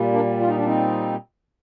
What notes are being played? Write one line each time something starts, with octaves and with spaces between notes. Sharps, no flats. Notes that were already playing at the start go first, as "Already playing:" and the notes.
Already playing: A#2 G3
A#3 D4
F4
D#4
D4
C4 D#4